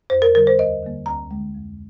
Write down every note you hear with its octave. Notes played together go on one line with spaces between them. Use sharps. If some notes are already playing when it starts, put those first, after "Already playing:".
F2 C5
A#4
D3 G3 A#4
C5
D#2 D#5
D3 G3 A#3
D2 A#5
D3 G#3
F2